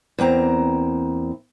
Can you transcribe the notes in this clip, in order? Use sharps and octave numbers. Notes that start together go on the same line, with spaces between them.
E2 A#3 C4 A#5